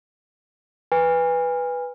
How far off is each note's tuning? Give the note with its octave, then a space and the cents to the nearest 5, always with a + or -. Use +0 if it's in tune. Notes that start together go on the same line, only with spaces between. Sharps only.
B4 +0 G#5 -30